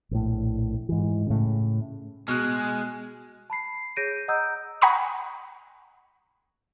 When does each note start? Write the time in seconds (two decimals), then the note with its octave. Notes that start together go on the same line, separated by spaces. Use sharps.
0.11 A#1 A2
0.89 G#2 E3
1.26 A2 C#3
2.28 B2 G#3 F6 F#6
3.50 A5 B5 C7
3.96 G#4 C#5 G6 A#6 D7 D#7
4.28 D#5 F#5 A#5 D#6 E6 G6
4.82 F#5 G#5 A#5 B5 C#6 D#6